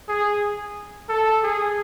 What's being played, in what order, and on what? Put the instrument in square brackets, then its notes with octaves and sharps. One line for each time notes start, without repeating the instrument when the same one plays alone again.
[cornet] G#4
A4
G#4